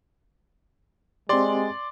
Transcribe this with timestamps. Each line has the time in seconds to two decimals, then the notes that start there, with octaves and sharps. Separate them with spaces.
1.29 G#3 C4 G4 D5 C6